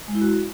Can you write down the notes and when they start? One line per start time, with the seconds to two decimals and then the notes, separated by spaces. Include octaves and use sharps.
0.08 G#3
0.15 E4
0.21 F#4